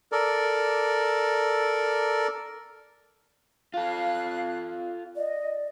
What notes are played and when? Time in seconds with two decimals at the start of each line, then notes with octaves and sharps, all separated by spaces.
0.12 A4 A#4 D5
3.74 F4 A4 F5 F#6
5.16 D5 D#5